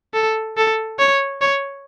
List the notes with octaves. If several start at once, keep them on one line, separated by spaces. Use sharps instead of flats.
A4
A4
C#5
C#5